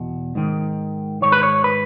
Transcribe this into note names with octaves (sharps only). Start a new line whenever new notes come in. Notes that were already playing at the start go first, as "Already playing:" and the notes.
Already playing: E2 B2
G#2 D#3
G#2 D#3 C#5
B4
C#5
B4